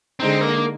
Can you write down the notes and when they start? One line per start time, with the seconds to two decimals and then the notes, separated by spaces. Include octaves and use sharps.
0.20 D3 G#3 C4 D#4
0.41 A#3